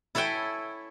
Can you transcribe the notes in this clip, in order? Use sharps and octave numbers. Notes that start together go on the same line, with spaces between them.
E4 A4 C#5 E5 G5 G#5